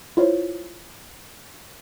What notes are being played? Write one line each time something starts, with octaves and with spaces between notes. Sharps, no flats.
E4 F4 C5 C#5